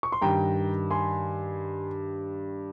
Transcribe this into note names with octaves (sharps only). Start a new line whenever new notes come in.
C#6
C6
G2 D#3 G5 A#5
G#5 C6